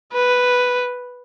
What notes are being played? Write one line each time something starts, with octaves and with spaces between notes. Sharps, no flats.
B4